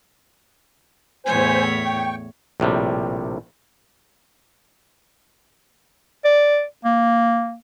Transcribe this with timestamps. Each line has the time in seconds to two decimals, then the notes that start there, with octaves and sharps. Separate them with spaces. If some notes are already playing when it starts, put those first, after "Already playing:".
1.26 E2 A2 C5 C#5 G#5
1.85 G5 C#6
2.60 A#1 A2 C3 G3
6.25 D5
6.85 A#3